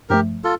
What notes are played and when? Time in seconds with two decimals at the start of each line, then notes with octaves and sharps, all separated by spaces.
0.10 G2 F3 A3 G4 A#4
0.44 F4 A4